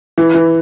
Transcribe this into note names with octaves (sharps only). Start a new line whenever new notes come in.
E3
E3